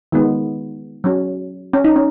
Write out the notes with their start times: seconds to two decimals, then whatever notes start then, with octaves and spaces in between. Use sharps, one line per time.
0.12 D#3 G#3 B3
1.04 F#3 C#4
1.73 C#4
1.84 D#4
1.96 C#4